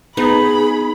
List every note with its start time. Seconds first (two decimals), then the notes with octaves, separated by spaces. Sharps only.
0.17 B3 D#4 G#4 B5